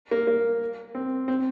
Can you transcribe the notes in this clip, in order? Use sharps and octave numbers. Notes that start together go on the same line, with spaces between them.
A#3
A#3
C4
C4